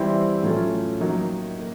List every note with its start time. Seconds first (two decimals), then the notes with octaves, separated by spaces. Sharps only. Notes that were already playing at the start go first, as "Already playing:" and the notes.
Already playing: E3 G3 C4 E4 G4
0.43 A2 F#3 A3 C#4 F4
1.00 D#3 F#3 A#3 D#4
1.59 A#3